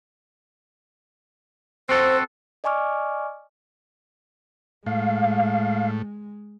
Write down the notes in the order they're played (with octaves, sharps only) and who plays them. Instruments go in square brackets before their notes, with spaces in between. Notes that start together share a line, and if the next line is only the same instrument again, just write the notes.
[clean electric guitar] C4 F#4 A4 [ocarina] C5
[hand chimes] D5 D#5 G#5 C#6 D6 F6
[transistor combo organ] A2 [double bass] G#3 [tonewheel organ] F5